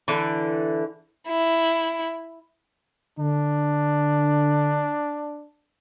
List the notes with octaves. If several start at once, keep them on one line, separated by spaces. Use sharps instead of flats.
D3 E3
E4
D3 D4